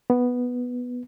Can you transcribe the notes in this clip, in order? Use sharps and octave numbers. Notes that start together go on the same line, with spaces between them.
B3